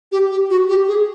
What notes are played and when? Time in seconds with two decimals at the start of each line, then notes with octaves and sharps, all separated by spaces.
0.12 G4
0.30 G4
0.50 F#4
0.69 G4
0.88 G#4